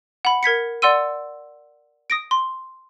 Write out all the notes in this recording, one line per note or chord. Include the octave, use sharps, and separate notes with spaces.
F#5 B5
A#4 G#6 B6 C#7
D5 F#5 C6 E6 D#7
D#6 A#6 D7
C6